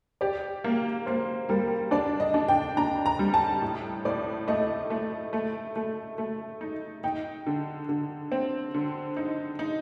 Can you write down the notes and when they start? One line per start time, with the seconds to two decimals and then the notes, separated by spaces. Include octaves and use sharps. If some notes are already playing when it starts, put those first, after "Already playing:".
0.21 G4 D5
0.64 A#3
1.06 A#3 C5
1.49 G3 A#4
1.91 D4 D5
2.20 D#5
2.34 D4
2.48 G5
2.77 D4 A#5
3.06 A#5
3.19 G3
3.34 A5
3.62 A2
4.05 A2 D5
4.48 A3 D#5
4.90 A3
5.33 A3
5.76 A3
6.18 A3
6.61 D#4
7.04 D#4 G5
7.46 D3
7.89 D3
8.32 C4
8.74 D3
9.17 D#4
9.59 D#4